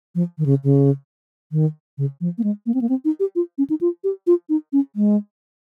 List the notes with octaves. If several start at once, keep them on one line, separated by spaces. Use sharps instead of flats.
F3
D#3
C#3
C#3
D#3
C#3
F3
A#3
G#3
A#3
C4
A#3
C4
D#4
G4
F4
C#4
D#4
F4
G4
F4
D#4
C#4
G#3